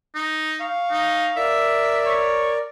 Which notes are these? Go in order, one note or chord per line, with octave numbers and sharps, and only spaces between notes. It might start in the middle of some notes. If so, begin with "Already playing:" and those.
D#4
F5 C#6
D#4
A#4 D5 E5
C#5